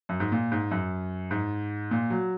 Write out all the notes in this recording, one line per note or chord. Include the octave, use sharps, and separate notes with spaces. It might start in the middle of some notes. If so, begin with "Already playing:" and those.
F#2
G#2
A#2
G#2
F#2
G#2
A#2
F#3